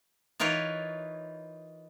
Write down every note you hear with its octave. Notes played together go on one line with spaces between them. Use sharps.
E3 D#4 F4 A#4 B4 C#5